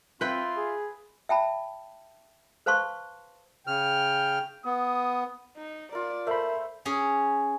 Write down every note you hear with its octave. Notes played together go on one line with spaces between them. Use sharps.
C4 F4 B4 E5 G5 C6
G#4
E5 G5 A5 B5
B4 C5 F5 A5 C6 C#6
C#3 G5 F6
B3 D#6
D#4
F4 A#4 D5
A3 A#4 C5 E5 B5
C#4 G#4